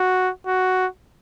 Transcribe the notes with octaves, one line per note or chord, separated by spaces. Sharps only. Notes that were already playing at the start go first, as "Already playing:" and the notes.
Already playing: F#4
F#4